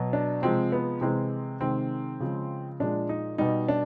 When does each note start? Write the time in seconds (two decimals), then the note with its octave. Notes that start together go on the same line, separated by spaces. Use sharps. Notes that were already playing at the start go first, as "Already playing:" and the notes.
Already playing: B2 F#3
0.13 D4
0.42 C3 F3 G#3 C4
0.72 B3
1.01 C3 E3 G#3 C4
1.61 C3 D#3 G#3 C4
2.20 C#3 F3 G#3
2.80 A#2 F3 G#3 D4
3.09 D#4
3.38 B2 G3 D#4
3.68 D4